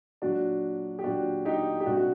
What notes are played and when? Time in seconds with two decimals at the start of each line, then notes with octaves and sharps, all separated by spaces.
0.22 A#2 F#3 D4 F#4
0.99 G4
1.04 A#2 F#3 D4 F#4
1.45 D#4 G4
1.80 G4
1.86 C3 G3 D4 F#4
1.97 F#4